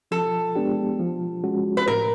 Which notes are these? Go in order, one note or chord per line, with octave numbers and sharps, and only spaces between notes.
F3 A4
G#3 B3 D4 G4
F3
G#3 C#4 F#4
B4
A2 A#4